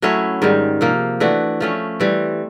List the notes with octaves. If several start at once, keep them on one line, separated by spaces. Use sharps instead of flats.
F#3 A3 C#4 E4
G#2 D#3 G3
C3 F3 A#3
E3 A3 D4 F#4
F3 A3 C#4
E3 G3 C4